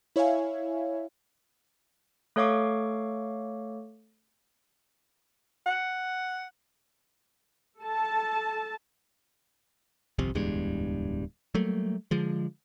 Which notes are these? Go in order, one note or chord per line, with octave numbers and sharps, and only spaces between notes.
E4 C#5 E5 F5 G#5
A3 A4 C#5 F5 C#6 D6
F#5
A4 A5
G1 C2 F2 C3
D1 E2 G2 G#3
F#3 G3 A3 A#3
D3 F3 G#3